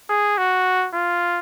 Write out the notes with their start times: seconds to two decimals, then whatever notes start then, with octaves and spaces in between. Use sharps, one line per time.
0.10 G#4
0.38 F#4
0.94 F4